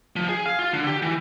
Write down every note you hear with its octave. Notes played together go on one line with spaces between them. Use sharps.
F3
G#4
F5
F4
D3
G4
E3